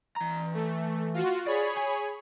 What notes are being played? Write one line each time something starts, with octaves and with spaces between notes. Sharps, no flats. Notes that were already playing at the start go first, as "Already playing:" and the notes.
E3 A#5
A3
F4 F#4
G#4 C#5 D5 B5
G#5